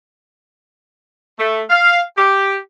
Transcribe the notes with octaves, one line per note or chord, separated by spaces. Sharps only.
A3
F5
G4